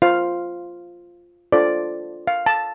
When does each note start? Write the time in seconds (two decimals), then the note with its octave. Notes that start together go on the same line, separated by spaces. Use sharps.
0.02 F4 C5 F5
1.52 D4 F4 A4 C5 D5
2.27 F5
2.46 A5